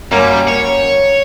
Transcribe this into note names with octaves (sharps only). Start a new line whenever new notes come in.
F#2 G3 A#3
C#5